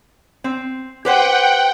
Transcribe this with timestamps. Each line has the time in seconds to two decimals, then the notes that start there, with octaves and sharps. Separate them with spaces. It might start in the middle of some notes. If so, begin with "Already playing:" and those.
0.44 C4
1.05 G4 B4 C5 F#5 G5